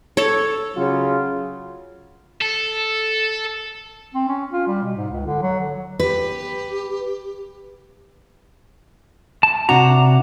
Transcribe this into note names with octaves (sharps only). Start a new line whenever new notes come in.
A4 C#5
C#3 F#3 F4
A4
C4
C#4
F4
G3
B2
G#2
C#2
D3
F#3
D3
G4 B4
A5
C3 D4 F#4 A#5